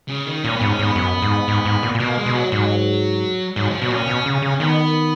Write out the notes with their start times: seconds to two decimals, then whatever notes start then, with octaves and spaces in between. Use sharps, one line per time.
0.09 C#3
0.26 D#3
0.44 A#2 C#4
0.56 G#2 B3
0.69 C#4
0.79 G#2 B3
0.95 F#2
1.22 G#2
1.48 G#2
1.65 G#2
1.83 A#2
1.95 A#2
2.00 B2 A#3
2.17 G#3
2.26 B2
2.34 F#3
2.51 G#2 F#3
3.56 G#2 F#3
3.70 F3
3.81 B2 F#3
3.90 A#2 C#4
4.08 B2
4.26 C#3
4.42 C#3
4.60 D#3 B3